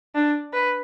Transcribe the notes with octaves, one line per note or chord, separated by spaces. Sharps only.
D4
B4